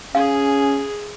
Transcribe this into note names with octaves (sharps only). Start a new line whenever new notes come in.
C#4 G#4 F5